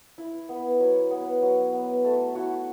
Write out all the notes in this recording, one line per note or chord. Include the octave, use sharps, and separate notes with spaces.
E4
B3
F#3
B3
F#3
B3
A3 A4
E4 F#4